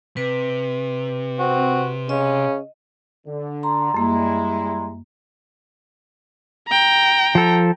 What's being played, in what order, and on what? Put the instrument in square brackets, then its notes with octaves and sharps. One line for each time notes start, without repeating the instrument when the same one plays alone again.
[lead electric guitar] C3 [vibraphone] B4
[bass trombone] C4 [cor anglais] F#4
[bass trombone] C#3 [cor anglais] C#4 [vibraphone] D#5
[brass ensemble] D3
[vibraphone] A#5 C6
[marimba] F#2 A#3 [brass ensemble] G3 G#3 E4
[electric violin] G5 A#5
[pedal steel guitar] F3 A4